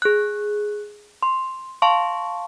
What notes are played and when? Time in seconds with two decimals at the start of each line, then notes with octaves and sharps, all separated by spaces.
0.02 G#4 F#6
1.23 C6
1.82 F5 A5 C6 C#6